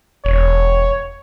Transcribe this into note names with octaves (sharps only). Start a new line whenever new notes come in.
E1 C#5